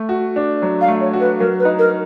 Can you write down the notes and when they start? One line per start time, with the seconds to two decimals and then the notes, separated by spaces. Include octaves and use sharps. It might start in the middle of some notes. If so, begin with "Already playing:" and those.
Already playing: A3
0.09 F#4
0.36 D4
0.62 F#3
0.81 F5
0.88 A3
1.01 C#5
1.13 F#4
1.20 B4
1.40 F#3 A#4
1.59 B4
1.65 D#4
1.79 A#4